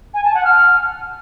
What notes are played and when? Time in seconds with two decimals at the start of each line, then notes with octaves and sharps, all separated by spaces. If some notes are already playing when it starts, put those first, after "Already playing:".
0.14 G#5
0.24 A5
0.34 F#5
0.45 F6